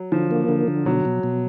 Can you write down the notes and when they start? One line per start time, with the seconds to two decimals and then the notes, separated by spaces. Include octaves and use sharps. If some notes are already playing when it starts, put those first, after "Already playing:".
Already playing: F#3
0.12 D3 F3
0.31 A#3
0.48 D3
0.68 D3
0.85 B2 F#3
1.05 B2
1.23 B2